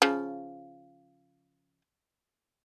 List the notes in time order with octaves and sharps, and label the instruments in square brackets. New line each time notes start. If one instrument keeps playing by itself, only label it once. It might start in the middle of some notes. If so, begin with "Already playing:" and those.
[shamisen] C#3 F3